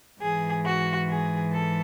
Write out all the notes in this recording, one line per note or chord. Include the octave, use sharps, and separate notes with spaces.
G#2 E3 G#4
F#4
G#4
A4